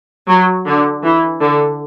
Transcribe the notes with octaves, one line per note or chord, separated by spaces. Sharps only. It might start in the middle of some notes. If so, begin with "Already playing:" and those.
F#3
D3
E3
D3